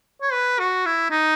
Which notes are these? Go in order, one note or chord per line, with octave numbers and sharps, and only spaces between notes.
C#5
B4
F#4
E4
D#4